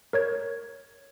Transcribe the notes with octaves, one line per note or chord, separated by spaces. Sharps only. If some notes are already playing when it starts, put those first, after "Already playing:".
A#4 C#5 G#6